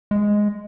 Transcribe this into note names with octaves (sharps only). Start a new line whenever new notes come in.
G#3